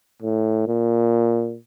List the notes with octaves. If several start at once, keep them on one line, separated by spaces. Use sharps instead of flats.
A2
A#2